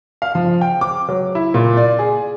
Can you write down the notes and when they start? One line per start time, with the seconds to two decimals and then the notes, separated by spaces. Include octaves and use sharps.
0.22 F5
0.35 F3
0.61 G5
0.81 D6
1.09 F#3
1.35 E4
1.54 A#2
1.77 D5
1.99 G#4